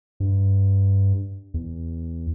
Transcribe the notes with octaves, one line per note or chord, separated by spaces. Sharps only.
G2
E2